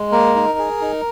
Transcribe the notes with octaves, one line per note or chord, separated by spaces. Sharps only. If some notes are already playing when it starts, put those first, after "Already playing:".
Already playing: G#3
A#3 A#4
D#4
G#4
D#4